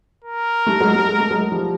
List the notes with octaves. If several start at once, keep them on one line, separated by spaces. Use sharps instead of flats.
A#4
G3 A3
F#3 G#3
G3 A3
G#3
A3
F#3 G#3
F3 G3